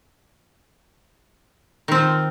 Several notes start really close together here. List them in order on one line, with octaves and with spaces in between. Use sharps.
D#3 C4 F4